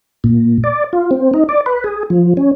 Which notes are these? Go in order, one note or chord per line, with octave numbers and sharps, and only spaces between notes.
A#2
D5
F4
C4
D#4
D5
B4
G#4
F3
C#4